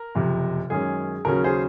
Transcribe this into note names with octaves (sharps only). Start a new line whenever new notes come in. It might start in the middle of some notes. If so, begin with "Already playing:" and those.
Already playing: A#4
F#1 F2 C3
F#2 D#3 G#3 C#4 G#4
D#2 C#3 F#3 C#4 A#4
G#4 C5